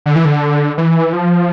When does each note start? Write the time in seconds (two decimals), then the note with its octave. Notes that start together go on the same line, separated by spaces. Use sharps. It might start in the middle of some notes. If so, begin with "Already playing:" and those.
0.06 D3
0.15 E3
0.25 D3
0.78 E3
1.13 F3